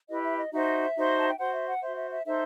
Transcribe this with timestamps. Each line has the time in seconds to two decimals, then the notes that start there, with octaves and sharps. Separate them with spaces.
0.08 E4 G4 B4 D#5
0.23 E5
0.36 D#5
0.51 D#4 F#4 C5 E5
0.95 D#4 F#4 C5
1.18 A5
1.28 G5
1.38 F#4 C5 F#5
1.53 E5
1.67 F#5
1.82 F#4 C5 E5
1.96 E5
2.10 E5
2.25 D#4 A4 C5 E5